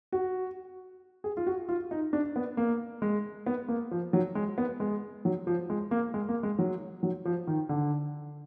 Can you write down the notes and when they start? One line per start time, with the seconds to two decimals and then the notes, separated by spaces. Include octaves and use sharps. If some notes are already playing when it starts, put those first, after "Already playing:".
0.12 F#4
1.24 G#4
1.37 F4
1.46 F#4
1.69 F4
1.91 D#4
2.13 D4
2.36 B3
2.57 A#3
3.02 G#3
3.46 B3
3.68 A#3
3.91 F3
4.13 F#3
4.35 G#3
4.58 B3
4.80 G#3
5.25 F#3
5.47 F3
5.70 G#3
5.91 A#3
6.14 G#3
6.29 A#3
6.43 G#3
6.59 F#3
7.03 F#3
7.25 F3
7.47 D#3
7.69 D3